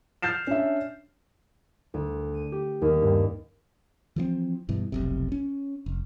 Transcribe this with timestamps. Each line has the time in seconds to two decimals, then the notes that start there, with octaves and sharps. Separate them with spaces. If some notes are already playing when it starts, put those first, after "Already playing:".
0.22 F6 G6 A6 C7 E7
0.47 C#4 D4 E5
1.94 D2
2.34 D#7
2.52 G4
2.82 D#2
3.02 G2
4.16 E3 F3 A#3 C4
4.69 G2 B2 E3
4.92 F1 B1 C3
5.32 C#4
5.86 F1